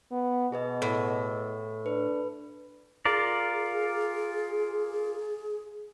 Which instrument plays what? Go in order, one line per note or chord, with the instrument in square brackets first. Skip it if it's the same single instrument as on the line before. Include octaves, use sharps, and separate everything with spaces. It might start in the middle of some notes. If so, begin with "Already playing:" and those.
[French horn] B3
[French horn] B2 [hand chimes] G#4 B4 D#5
[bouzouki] A2
[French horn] D4 [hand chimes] B4
[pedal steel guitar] F4 A#4 D5 [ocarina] G#4